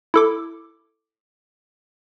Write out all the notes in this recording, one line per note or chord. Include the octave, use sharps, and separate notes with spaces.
E4 A4 D6